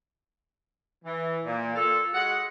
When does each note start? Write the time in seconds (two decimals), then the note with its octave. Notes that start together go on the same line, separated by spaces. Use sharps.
1.04 E3
1.44 A#2
1.75 F4 A4
2.14 G#3 F#4 F#5